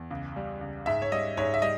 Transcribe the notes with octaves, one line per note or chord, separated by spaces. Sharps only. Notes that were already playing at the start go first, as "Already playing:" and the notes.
Already playing: E2
C#2
G3
C#2
G#2 E5
C#5
G3 D#5
G#2 C#5
E5
G3 D#5